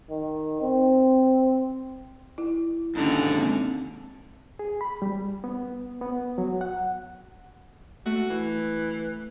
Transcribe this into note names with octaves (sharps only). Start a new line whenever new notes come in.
D#3
C4
E4
D#2 G#2 D3 C#4
A#3 C4
G#4
B5
G3
B3
B3
F#3
F#5
A3 F#4
E3